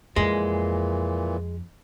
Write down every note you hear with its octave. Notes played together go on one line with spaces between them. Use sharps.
F2 A#2 E3 G#3